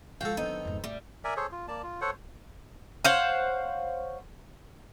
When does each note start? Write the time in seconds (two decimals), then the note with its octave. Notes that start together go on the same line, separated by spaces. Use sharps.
0.21 F3 G#3 F4 F#4 A4 F5 G5
0.37 D#3 F#3 B3 C4 D4 D#4
0.65 F2 G#2
0.84 A1 G3 A3
1.24 A#4 D5 E5 G#5
1.37 G#4 A4 C5 C#5
1.52 F4
1.68 A#3 D5 A5
1.83 F4
2.01 A4 C5 C#5 F#5
3.05 C5 C#5 F5 F#5